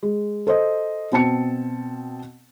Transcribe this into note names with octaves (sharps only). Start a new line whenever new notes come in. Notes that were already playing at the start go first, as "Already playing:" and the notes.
G#3
A4 C5 D#5
B2 C4 A5 C#7